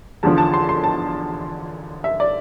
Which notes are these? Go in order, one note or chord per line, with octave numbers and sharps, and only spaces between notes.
E2 D3 F3 A5
A5
C6
C6
A5
E5
D5